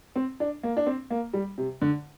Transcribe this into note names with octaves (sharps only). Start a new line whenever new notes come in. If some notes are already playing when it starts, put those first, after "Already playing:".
C4
D4
A#3
D4
C4
A#3
G3
C3
D3